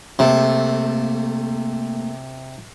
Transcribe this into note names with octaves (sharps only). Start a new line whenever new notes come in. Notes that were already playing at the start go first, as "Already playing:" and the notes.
C3 A3 A#3 A4